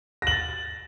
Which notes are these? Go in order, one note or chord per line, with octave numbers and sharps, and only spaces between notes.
A6 A#6 F#7